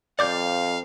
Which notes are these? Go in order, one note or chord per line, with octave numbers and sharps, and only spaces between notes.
F2 D5 F5 D6 G6